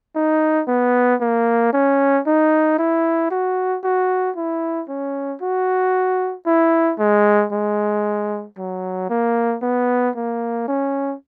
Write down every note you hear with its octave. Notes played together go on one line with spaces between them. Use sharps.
D#4
B3
A#3
C#4
D#4
E4
F#4
F#4
E4
C#4
F#4
E4
G#3
G#3
F#3
A#3
B3
A#3
C#4